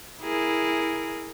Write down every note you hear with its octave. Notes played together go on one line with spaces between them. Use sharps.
E4 G#4 A#4